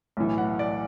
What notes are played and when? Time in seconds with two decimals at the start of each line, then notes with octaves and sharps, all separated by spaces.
0.17 B1 A2 E3
0.38 F#5
0.59 D5